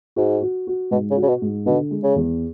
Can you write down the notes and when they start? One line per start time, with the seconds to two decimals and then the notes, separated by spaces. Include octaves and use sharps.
0.16 G#2 F#4
0.42 F#4
0.67 F#4
0.91 G#2 B2
1.10 C#3
1.17 F#4
1.22 C#3
1.28 B2
1.42 G#2
1.66 B2 D3
1.91 G#3
2.03 C#3
2.16 E2